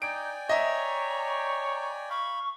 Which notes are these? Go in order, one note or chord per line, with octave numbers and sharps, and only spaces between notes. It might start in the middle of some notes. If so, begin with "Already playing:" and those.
D#4 D5 G5 G#5 D7
C#5 D#5 E5 A#5
F5 B5 C#6